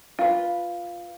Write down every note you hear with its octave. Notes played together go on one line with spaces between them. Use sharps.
F4 B4